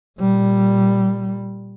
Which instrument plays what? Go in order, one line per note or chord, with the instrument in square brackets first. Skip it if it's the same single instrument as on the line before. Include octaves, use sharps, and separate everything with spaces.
[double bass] A#2 G3